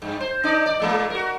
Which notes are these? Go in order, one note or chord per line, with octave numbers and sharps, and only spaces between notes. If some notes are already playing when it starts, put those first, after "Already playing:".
G2
C5
D4 D#4 D5
D5
A#2 G#3 A#3
F#4 A#4